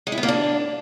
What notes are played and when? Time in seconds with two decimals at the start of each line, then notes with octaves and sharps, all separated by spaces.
0.07 G#3
0.12 E4
0.18 B3
0.23 A#3
0.28 D4